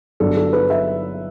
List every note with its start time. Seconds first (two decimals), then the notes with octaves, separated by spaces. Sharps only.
0.20 G1 G2 F#3 B3 D4 A4
0.37 A4
0.53 B4
0.70 E5